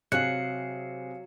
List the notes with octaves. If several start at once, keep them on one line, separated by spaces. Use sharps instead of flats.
C3 F#3 G#4 F5 F#6 C#7